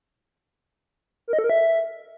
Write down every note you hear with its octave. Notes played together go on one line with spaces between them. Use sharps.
A#4
D#5
A4
A#4
E5